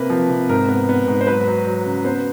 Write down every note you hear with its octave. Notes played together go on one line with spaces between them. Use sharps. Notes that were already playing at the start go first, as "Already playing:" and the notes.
Already playing: C3 A#3 B4
F3
C3
G#2 A#4
B3
B3
G#2
C5
F#3 B4
F#3
F#3
C#3
B3 C5